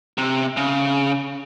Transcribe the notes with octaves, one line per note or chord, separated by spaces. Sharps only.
C3
C#3